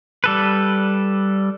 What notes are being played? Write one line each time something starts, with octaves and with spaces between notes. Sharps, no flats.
G3 A4 B4